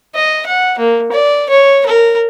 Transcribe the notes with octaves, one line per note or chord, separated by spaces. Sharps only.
D#5
F#5
A#3
D5
C#5
A#4